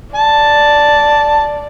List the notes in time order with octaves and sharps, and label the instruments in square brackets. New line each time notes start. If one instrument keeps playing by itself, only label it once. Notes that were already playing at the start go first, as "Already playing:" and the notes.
[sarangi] D5 [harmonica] A5